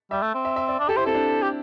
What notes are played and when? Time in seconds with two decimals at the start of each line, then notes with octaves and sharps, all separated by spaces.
0.11 G3 E5
0.22 A3
0.34 C4
0.45 E5
0.56 E5
0.68 D5
0.80 D4
0.89 G4 A4
0.97 E4 C5
1.06 C4 A4
1.14 D4
1.42 G4